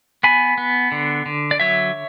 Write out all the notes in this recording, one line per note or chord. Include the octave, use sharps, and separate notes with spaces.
B3 G#5 B5
B3
D3
D3
D5
F#3 C#5 E5